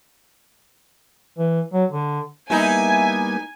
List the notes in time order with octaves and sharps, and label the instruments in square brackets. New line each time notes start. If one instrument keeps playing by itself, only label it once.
[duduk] E3
F#3
D3
[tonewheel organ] G3 A#3 B3 [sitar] D#4 E4 [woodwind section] E5 [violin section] G#5